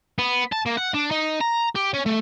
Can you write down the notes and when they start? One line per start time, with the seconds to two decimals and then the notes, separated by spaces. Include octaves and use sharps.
0.19 B3
0.52 A5
0.66 A#3
0.77 F#5
0.94 D4
1.11 D#4
1.41 A#5
1.76 G4
1.94 C#4
2.06 A3